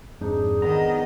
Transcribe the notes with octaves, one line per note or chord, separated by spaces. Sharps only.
F2 G#2 D4 D#4 G#4
D#3 B3 D#5 A#5